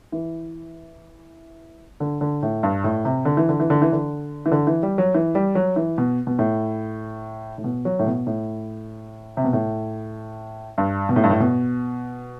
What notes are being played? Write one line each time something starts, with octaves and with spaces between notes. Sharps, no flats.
E3
D3
D3
A2
G2
A2
C3
D3
E3
D3
E3
D3
E3
D3
E3
D3
E3
G3
F#3
E3
G3
F#3
E3
B2
B2
A2
A2
B2
F#3
A2
B2
A2
C3
B2
A2
G2
B2
A2
G2
A2
B2